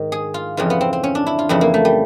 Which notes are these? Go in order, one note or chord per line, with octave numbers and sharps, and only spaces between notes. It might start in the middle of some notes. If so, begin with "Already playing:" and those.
Already playing: G#2 D#3
G#4
F4
F2 C#3 E3 F4
B3
C4
C4
C#4
D4
E4
F4
F2 C#3 E3 E4
A#3
A3
G3